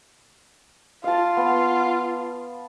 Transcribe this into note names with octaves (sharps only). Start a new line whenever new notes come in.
F4 F5 A5
B3